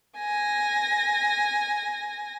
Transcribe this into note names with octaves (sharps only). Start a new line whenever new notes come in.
G#5 A#6